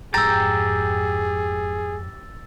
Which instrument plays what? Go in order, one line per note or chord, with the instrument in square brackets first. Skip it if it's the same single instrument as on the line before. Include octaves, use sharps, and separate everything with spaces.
[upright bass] F2 G#2 [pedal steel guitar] G4 G5 A#5 [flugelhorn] G#4 [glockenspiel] E6 A6